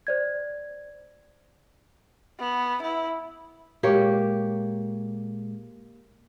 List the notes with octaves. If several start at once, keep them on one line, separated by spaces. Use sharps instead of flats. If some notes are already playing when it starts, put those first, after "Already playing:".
C5 D5 G#6
B3
E4
A#2 G#3 A#3 G4 C#5